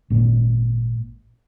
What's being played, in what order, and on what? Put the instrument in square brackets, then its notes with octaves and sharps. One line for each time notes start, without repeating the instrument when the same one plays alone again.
[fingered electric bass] G#1 A#2